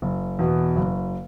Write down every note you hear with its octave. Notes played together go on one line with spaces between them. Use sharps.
F#1
E2 B2
F#1